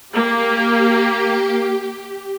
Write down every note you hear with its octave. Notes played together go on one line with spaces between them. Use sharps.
A#3 G4